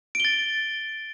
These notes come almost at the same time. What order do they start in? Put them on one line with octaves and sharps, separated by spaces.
D7 G7 A6